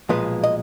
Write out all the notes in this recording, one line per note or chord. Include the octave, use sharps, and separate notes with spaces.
B1 A#2 F3 G#3 B4
D#5